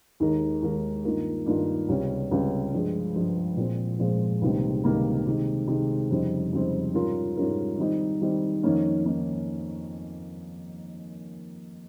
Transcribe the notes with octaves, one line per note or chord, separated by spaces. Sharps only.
D#2 D#3 G#3 D#4 A#4
D#2 D#3 G#3 D#4 A#4
G2 D#3 A#3 F4 A#4
G2 D#3 A#3 F4 A#4
C#2 C3 G3 C#4
C#2 C3 G3 C#4
G2 F3 G#3
G2 F3 G#3
A#2 F3 G#3 C4
A#2 F3 G#3 C4
C#2 C3 D#3 G3 A#3
C#2 C3 D#3 G3 A#3
C3 D#3 G#3
C3 D#3 G#3
F2 C#3 G3 C4 D#4
F2 C#3 G3 C4 D#4
G#2 G3 C#4 F4 A#4
G#2 G3 C#4 F4 A#4
D#3 G3 C4 D#4
D#3 G3 C4 D#4
F2 D#3 A#3 C#4
D#3 A#3 C#4